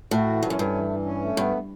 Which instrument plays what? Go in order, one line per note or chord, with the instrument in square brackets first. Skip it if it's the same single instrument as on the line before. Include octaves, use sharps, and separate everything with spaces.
[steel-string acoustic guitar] A2 [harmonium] F#4
[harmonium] E3
[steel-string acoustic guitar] G2 [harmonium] C#4
[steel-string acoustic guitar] F#2
[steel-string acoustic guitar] G2 [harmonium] A3
[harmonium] E3
E3
C#4
A3
[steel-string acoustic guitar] G2 [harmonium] B3